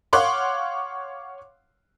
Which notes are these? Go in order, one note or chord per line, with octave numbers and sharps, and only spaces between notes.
C#5 F5 F#5 C6 D6 F#6